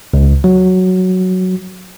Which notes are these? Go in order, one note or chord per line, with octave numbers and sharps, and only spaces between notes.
C#2
F#3